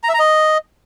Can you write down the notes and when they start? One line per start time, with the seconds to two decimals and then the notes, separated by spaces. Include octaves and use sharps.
0.04 A#5
0.09 E5
0.14 A#5
0.19 D#5